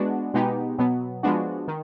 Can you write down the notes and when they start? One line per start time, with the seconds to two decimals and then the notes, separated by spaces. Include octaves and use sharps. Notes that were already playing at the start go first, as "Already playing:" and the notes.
Already playing: G#3 B3 D4 F#4
0.34 B2 G#3 B3 D#4 G4
0.78 B2 F#3 B3
1.23 F3 G#3 B3 D4 F#4
1.68 D#3